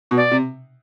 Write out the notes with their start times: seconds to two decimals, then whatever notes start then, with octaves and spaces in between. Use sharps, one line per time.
0.11 B2
0.17 D5
0.31 C3